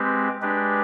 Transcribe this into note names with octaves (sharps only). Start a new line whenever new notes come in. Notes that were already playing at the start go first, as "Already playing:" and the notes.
Already playing: G#3 C4 G4 B4
G#3 D4 G4 B4